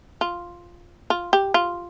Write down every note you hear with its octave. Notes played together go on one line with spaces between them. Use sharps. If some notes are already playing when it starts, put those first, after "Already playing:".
F4
F4
G4
F4